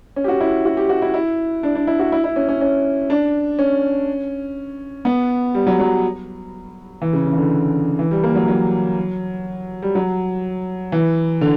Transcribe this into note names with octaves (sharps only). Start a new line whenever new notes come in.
C#4
G4
F#4
E4
F#4
G4
F#4
E4
E4
D4
D4
E4
F#4
E4
E4
C#4
C#4
C#4
D4
C#4
B3
G3
F#3
F#3
E3
C#3
C#3
E3
D3
E3
G3
A#3
F#3
F#3
G3
F#3
E3
D3